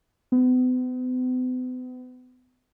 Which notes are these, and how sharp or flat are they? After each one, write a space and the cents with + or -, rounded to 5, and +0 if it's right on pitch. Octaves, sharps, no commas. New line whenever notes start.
B3 +40